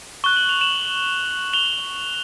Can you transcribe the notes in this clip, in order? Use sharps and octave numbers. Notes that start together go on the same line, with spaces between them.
C#6 F#6 G7
F#7
F7
E7 F#7
F7 G7